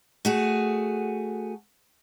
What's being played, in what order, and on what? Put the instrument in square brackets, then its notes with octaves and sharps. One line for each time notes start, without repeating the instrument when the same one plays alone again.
[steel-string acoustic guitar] A3 F#4 G#4